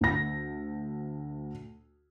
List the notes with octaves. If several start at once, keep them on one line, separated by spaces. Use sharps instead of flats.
D2 A#6